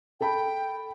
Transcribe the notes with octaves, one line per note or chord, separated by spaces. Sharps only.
A4 G5 A5 B5